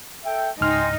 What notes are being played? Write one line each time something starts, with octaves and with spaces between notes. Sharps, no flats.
A4 E5 G5
C#2 G#2 D#4 G5 G#5 C6 F6